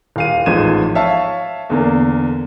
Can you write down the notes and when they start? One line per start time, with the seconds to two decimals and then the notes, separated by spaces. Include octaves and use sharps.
0.16 D#1 F5 D#7
0.46 A1 G#2 F3 G#6 D#7 E7
0.95 C#5 E5 F5 A5
1.70 E2 D3 A#3